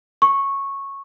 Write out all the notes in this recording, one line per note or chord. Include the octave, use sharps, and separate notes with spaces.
C#6